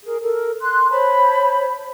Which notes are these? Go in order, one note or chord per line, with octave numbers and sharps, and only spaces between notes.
G#4 A#4
A4 A#4
C6 F#6
C5 C#5 A5 B5